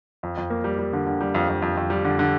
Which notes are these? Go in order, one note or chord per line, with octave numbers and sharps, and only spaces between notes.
F2
F2
A#3
G3
G3
D3
D3
G3
F2
F2
F2
F2
G3
D3
D3